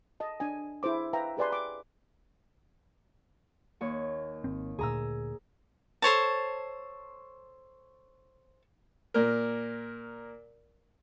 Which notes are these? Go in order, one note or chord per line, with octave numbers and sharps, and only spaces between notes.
D#5 A5
D4 G#5
E4 G#4 C5 D6
B4 E5 F5 G5 A#5
G4 G#4 B4 D5 G#5 C6
B5 D6
D#2 C#5
G#1 C4
D2 A#2 G#4 A#5 E6
A4 C5 C#5 A5
A#2 A#4